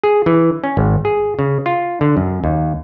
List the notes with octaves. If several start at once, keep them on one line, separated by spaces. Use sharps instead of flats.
G#4
E3
C#4
G#1
G#4
C#3
F4
D3
F#2
D#2